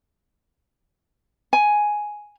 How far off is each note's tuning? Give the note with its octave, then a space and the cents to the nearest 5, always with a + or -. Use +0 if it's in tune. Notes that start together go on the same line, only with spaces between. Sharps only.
G#5 +5